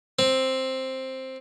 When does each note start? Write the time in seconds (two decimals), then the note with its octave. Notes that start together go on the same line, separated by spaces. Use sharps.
0.19 C4